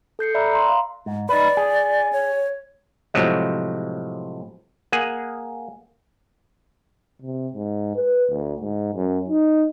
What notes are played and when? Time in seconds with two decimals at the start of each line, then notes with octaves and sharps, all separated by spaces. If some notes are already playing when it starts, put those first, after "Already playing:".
0.19 A4 G6 C7 C#7
0.35 D5 E5 A#5 B5 E6 F#6
0.53 A#5 C6
0.68 F5 C6
1.06 G#2
1.29 D#4 B4 D5
1.57 G#4
2.13 C#5
3.14 A2 C3 F3 F#3 G#3
4.92 A#3 G#4 F#5 G#5
7.22 C3
7.53 G#2
7.96 B4
8.31 D2
8.61 G#2
8.95 F#2
9.29 D#4